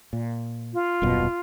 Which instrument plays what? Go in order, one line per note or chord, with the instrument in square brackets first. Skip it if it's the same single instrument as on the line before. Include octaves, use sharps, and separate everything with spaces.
[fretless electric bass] A#2
[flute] F4
[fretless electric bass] D#1 F#2 B2